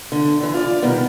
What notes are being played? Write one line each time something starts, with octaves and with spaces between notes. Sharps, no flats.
D3
D3 E3
F4 D5
B2 D#3 G3 B3